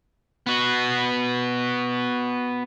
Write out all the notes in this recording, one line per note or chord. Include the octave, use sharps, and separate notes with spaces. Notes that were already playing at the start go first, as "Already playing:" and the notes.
B3 F#4